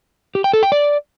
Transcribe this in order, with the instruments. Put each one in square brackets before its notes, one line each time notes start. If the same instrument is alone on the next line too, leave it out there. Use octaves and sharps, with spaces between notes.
[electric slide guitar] G4
G5
A4
G5
D5